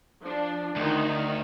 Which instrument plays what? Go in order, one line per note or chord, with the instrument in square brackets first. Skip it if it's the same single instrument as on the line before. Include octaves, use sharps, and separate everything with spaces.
[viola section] F3 D4
[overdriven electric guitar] D2 [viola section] D#3 D#4